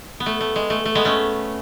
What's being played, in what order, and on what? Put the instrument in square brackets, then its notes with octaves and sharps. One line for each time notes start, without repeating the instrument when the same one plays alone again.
[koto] B3
A3
A3
G#3
A3
A3
G#3 B3
A3 C#4